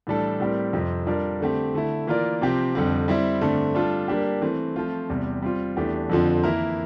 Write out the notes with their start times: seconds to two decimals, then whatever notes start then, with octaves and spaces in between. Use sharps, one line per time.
0.07 A2 E3 G3 D4 A4
0.40 A2 G3 C4 G4 A#4
0.73 F2 C3 F3 C4
1.07 G3 D4 F4 A#4 D5
1.40 D3 A3 C4 G4
1.74 D3 A3 E4
2.07 E3 A#3 F4 A#4 D5
2.41 C3 F3 C4 G4
2.75 F2 D3 G3 C4
3.08 G3 C4 E4
3.41 G2 D3 A3 C4
3.74 G3 D4 F4 A4
4.08 G3 A#3 D4 G4
4.42 E3 A3 C4
4.76 F3 A3 C4 F4
5.09 E2 C3 G3
5.42 G3 C4 F4
5.76 E2 E3 A3 D4 G4
6.09 F2 D3 F3 C4
6.43 E3 A#3 E4 A#4